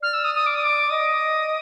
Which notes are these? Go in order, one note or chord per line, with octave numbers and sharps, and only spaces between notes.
D5 F6
E6
D#6
D#6
D6
D#6
D6
D#5 D#6